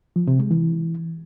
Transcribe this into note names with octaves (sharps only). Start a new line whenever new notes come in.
F3
C3
G#3
E3